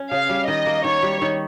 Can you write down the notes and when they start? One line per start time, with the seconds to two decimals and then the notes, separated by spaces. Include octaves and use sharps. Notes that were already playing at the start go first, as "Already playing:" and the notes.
Already playing: C#4
0.11 C#3 F5
0.29 G3
0.48 D#3 D#5
0.66 A#3
0.84 D#3 C#5
1.03 G3
1.22 D#3